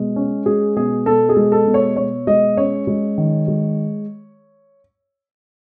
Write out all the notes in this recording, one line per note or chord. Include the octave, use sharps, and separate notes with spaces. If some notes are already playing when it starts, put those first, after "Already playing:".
Already playing: B2 G#3
C#4
G#3 G#4
B2 G#4
B2 A4
G#4
G#3
A4
B2
C#5
B2 C#5
G#3 D#5
C#4 C#5
G#3
D#3
G#3